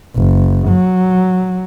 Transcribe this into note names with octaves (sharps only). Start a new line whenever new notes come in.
F#1
F#3